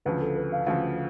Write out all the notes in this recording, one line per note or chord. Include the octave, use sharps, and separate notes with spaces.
D2 C#3 F3 B4
A4
B4
F5
D2 C#3 F3 F5